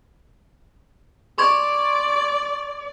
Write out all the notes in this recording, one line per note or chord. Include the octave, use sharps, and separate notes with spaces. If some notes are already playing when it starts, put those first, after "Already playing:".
D5 C6 C#6 G#6